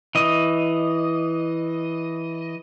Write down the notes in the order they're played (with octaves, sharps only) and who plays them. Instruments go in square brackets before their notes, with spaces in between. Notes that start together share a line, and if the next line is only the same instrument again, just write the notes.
[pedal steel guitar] E3 D#5